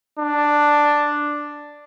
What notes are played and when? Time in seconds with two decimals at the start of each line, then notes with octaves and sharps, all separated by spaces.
0.19 D4